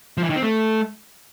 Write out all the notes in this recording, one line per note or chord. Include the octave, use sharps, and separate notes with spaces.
F3
E3
D#3
C4
A3